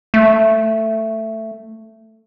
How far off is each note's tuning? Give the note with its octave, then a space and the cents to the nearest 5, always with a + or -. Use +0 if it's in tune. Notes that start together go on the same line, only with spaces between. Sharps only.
A3 +10